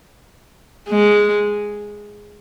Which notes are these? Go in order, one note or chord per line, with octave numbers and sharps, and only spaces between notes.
G#3